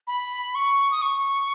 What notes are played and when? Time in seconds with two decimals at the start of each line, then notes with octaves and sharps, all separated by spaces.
0.07 B5
0.55 C#6
0.91 D#6
1.02 C#6